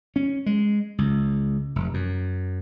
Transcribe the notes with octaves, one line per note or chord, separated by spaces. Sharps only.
C#4
G#3
C#2
F1
F#2